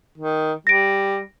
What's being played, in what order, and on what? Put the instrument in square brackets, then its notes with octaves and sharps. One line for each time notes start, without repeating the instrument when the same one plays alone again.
[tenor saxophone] D#3
[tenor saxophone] G3 [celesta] A#6 D7